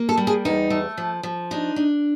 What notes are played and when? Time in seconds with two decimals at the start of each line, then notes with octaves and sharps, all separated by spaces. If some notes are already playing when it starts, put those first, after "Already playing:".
Already playing: A#3
0.09 A4
0.18 G3
0.27 G#4
0.45 E2 D#4
0.70 A3
0.98 F3
1.23 F3
1.51 D4 D#4
1.76 D4